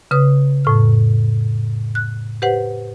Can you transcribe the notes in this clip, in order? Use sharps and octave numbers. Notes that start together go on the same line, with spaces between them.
C#3 B4 D#6
F2 A2 F6
F#6
G4 B4 C5 F#5